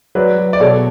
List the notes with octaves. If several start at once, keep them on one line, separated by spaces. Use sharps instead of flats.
F#3 B4 D5
F#3
D5
B2 A4 C#5